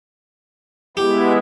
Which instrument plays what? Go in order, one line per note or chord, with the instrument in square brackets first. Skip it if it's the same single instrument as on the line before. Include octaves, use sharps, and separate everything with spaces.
[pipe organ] G#3 B3 E4 [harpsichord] G4